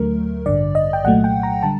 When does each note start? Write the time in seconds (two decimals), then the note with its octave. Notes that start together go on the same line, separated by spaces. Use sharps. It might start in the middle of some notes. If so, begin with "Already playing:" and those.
Already playing: D2 D3 F#3 A3 A#4
0.46 A1 G2 D3 D5
0.75 D#5
0.93 G5
1.04 C2 A#2 F#3 A3 F#5
1.24 G5
1.43 A#5
1.63 D3 G3 A5